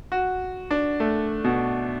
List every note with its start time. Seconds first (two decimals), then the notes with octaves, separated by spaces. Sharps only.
0.12 F#4
0.71 D4
1.00 A3
1.44 B2